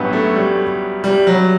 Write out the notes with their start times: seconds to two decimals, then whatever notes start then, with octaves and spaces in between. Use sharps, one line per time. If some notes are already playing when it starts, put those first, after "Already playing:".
Already playing: A1 G2 F#3 B3
0.13 A3
0.36 G3
1.04 G3
1.27 F#3